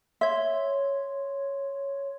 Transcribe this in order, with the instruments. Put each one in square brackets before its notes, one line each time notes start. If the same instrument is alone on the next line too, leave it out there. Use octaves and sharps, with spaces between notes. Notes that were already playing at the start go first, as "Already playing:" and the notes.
[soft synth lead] C#5 [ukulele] E5 [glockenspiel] C6 G#6